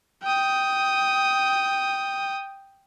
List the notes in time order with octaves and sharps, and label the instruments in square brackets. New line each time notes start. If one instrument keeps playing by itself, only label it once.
[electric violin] G5 D#6